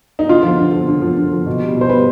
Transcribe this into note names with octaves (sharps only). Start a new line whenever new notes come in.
D#4
D3 F4
F3
D3
F3
D3
F3
D3
F3
B2
G3
B2 C5
G3 B4